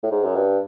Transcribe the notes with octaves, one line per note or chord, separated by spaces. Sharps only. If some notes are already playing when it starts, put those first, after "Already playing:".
A2
G#2
F#2
G2